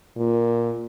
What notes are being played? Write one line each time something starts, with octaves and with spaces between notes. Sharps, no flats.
A#2